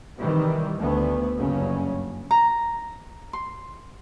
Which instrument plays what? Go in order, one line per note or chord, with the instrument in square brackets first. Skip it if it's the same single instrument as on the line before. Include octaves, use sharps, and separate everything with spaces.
[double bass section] C3 D#3 E3 G3
D2 A3 B3
F#1 G2 C#3 F#3 C#4
[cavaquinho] A#5
C6